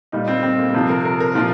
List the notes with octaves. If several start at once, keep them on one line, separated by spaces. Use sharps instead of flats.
A#2 G3 D#4
C4
C4
A#3
A#3
C3 F3 C4
A#4
A#4
A#4
A#2 F3 F4